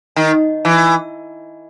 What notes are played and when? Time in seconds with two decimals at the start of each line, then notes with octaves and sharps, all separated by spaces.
0.16 D#3
0.65 E3